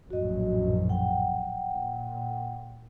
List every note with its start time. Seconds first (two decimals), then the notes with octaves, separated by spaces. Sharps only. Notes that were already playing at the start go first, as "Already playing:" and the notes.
0.10 A#1 F#2 A2 F#4 D#5
0.89 F#5 G5
1.71 A#2